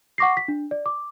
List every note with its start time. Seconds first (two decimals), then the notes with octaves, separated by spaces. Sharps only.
0.18 F#5 C#6 D6 A#6 C7
0.37 B6
0.48 D4
0.71 D5
0.86 D6